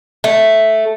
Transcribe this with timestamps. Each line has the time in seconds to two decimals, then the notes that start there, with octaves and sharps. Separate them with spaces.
0.24 A3